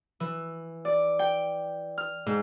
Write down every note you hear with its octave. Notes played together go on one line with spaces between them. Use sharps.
E3
D5
G5
F6
G#2